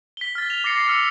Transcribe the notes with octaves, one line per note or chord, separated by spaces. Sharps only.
B6 G7
F6 A6
F7
D6 A6 A#6 C7 C#7
E6 F6 C#7